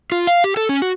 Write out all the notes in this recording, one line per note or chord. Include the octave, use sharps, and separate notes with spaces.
F4
F5
G4
A4
C#4
F#4